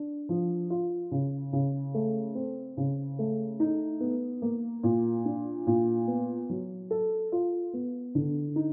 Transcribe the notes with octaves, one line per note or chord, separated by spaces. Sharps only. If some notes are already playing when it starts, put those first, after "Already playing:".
Already playing: D4
F3
F4
C#3
C#3
A3
C4
C#3
A3
D#4
B3
A#3
A#2
D4
A#2
B3
F#3
A4
F4
B3
D3
D#4